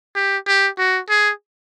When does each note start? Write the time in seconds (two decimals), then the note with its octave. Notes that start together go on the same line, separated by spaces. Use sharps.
0.16 G4
0.47 G4
0.78 F#4
1.09 G#4